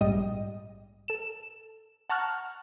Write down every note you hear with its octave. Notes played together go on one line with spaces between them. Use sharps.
A#1 G#2 G3 D#5
A4 E7
F#5 A5 A#5 C#6 F6 F#6